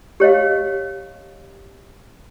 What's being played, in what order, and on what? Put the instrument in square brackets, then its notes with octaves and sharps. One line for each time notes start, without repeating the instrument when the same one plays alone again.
[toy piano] G4 C#5 D#5 F5